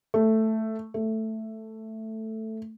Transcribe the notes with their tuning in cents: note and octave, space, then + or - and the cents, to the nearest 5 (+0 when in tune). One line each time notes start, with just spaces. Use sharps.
A3 +5
A3 +5